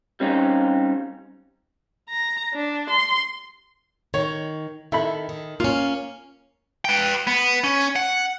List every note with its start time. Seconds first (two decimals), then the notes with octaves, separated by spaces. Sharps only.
0.20 G3 C4 C#4 D#4 F4 G4
2.09 A#5
2.54 D4
2.90 C6
4.14 D#3 C#5
4.92 D#3 E4 A4 B5
5.29 D#3
5.60 A#3 C#4 F4
6.85 B4 G5
7.27 B3
7.64 C#4
7.96 F#5